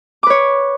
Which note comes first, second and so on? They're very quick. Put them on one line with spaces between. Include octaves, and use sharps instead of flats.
D6 B4 C#5